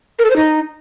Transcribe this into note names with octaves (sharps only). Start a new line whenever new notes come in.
A#4
A4
C5
D#4